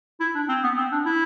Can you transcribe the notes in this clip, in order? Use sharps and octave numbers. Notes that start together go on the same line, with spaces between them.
E4
D4
C4
B3
C4
D4
E4